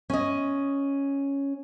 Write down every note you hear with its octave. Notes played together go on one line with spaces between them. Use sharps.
C#4 D#5